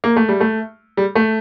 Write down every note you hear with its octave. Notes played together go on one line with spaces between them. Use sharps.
A#3
A3
G3
A3
G3
A3